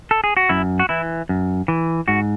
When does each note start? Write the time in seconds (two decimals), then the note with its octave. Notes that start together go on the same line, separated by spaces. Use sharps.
0.11 A4
0.24 G#4
0.37 F#4
0.49 F#2 E4
0.79 F#4
0.89 E3 E4
1.29 F#2
1.68 E3
2.08 G#2 F#4